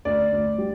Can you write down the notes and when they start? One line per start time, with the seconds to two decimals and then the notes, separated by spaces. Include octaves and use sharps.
0.05 D2 D5
0.32 D2
0.58 G3